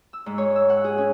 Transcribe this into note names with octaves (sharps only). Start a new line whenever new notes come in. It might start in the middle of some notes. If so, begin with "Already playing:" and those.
E6
G#2
C#5
E6
F#5
G#4
C#4